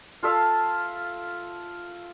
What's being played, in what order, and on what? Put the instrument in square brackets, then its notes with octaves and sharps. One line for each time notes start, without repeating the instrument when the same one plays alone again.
[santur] F4 A4 E5 F5